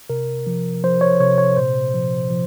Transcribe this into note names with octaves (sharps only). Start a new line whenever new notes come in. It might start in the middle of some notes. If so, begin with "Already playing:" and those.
C3 A#4
F3
F3 C5
C#5
C3 C#5
C#5
A#2 C5
F3
F3